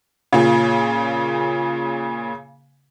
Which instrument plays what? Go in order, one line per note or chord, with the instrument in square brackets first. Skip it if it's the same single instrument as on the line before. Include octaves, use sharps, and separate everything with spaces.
[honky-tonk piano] A#2 C#3